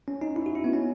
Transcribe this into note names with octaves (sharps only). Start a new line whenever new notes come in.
C#4
D#4
E4
F#4
E4
B3
C#4